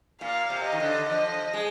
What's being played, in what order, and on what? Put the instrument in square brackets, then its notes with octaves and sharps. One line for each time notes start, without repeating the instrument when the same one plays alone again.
[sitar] A#2 [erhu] F5
[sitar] C3
[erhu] D#5
[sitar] D#3
D3
[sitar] F3 [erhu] D#5
[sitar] G#3